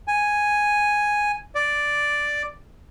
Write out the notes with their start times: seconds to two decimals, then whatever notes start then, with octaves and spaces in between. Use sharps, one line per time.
0.08 G#5
1.55 D5